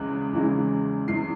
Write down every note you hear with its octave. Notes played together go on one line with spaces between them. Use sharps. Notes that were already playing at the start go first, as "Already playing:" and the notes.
Already playing: E2 C#3 E3 G#3 F#6
E2 C#3 E3 G#3
E2 C#3 E3 G#3 C7